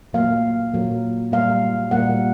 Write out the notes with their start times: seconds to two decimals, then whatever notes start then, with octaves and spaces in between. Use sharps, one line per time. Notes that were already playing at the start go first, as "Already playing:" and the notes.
0.13 A#2 F#3 A#3 F5
0.74 A#2 F#3 A#3
1.32 A#2 G3 A#3 F5
1.91 A#2 G3 A#3 F#5